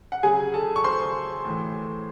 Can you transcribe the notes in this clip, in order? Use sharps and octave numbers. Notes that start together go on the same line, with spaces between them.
F#5
C#3 F#3 G#4 G#5
A4 A5
C#6
C5 C6
A2 E3